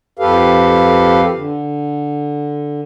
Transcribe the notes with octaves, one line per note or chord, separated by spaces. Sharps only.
F2 G4 A4 B4 F5
D3